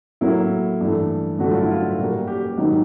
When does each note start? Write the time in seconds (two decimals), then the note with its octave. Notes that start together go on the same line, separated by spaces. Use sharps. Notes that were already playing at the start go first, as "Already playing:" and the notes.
0.21 A2 F#3 A#3 E4
0.81 G2 E3 A3
1.39 G2 D3 F#3 A3 F#4
1.50 F4
1.61 E4
1.71 F4
1.98 A#2 G3 A#3 F#4
2.27 G4
2.58 G#2 D#3 F#3